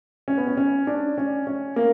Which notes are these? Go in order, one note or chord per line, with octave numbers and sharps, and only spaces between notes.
C#4
B3
C#4
C#4
D4
C#4
C#4
A#3